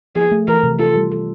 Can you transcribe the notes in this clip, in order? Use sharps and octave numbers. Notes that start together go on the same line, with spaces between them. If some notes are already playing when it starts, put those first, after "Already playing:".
F3 G#4
A3
E3 A#4
C3
F4 A4
G3
A4